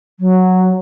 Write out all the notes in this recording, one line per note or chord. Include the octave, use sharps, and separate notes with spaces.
F#3